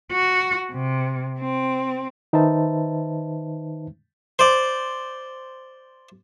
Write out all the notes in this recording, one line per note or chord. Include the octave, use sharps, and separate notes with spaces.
F#4
C3
C4
D#3 D#4 B4 C5 E5 A5
C5 D5